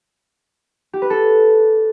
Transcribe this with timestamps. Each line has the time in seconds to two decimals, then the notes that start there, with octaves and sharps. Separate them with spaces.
0.93 G4
1.02 B4
1.10 A4